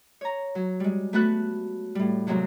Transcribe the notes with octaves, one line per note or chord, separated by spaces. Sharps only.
C#5 A#5
F#3
G3 G#3
A3 B3 F#4 A4 B4 F#6
A2 G3
C3 F#3 G#3 A#3 C4